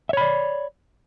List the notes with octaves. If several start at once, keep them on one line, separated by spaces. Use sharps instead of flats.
C#5 D5 E5 B5